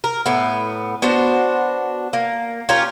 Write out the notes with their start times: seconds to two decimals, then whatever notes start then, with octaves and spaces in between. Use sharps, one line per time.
0.04 A#4
0.26 A2 B3
1.02 B3 D4 F#4 C5
2.13 A#3
2.69 C#4 F4 G4 A#4